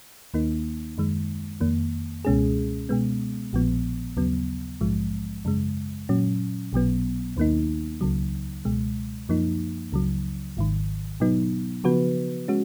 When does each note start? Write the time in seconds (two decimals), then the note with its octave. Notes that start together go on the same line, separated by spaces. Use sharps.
0.34 D#2 D#3 A#3 D#4
0.98 F#2 D#3 G#3
1.61 F2 D#3 A#3
2.25 C#2 B2 G#3 C#4 G#4
2.89 B2 G#3 B3
3.53 A#1 A#2 F3 B3
4.17 D#2 C#3 F#3 B3
4.81 A#1 G#2 F3 G#3
5.45 F#2 C#3 G#3
6.09 A#2 F#3 C#4
6.73 B1 B2 F#3 B3
7.37 D#2 D#3 A#3 D#4
8.01 C#2 C#3 F#3
8.65 C#2 B2 G#3
9.29 F#2 F3 A#3 D#4
9.92 C#2 C#3 F#3
10.57 G#1 G#2 D#3
11.20 B2 F#3 B3 D#4
11.84 C#3 F3 B3 F#4 B4
12.48 G#3 C#4 F#4